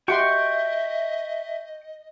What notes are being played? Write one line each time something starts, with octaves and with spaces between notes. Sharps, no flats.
F#4 G4 D#5 E5 G5 C6 C#6